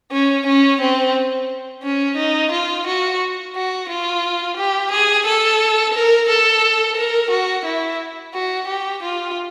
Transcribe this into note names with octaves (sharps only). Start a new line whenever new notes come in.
C#4
C#4
C4
C#4
D#4
F4
F#4
F#4
F4
G4
G#4
A4
A#4
A4
A#4
F#4
E4
F#4
G4
F4